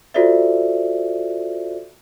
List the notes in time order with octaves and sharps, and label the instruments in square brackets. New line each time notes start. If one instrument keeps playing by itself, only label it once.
[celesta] F4 F#4 A4 C5 D5 E5